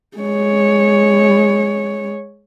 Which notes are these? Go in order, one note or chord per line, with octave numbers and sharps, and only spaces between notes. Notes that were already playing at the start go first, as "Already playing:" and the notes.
G#3 C#5